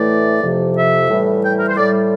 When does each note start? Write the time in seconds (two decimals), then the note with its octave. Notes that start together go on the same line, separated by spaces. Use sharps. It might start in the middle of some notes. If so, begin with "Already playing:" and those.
Already playing: A2 E3 A3 D5
0.43 F2 C3 F3
0.76 E5
1.10 A2 E3 G3
1.44 G5
1.59 A#4
1.68 C5
1.77 A2 G3 D5